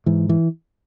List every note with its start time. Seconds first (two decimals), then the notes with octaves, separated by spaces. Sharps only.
0.06 G#2 E3
0.29 E3